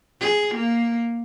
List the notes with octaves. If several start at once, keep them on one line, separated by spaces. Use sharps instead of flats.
G#4
A#3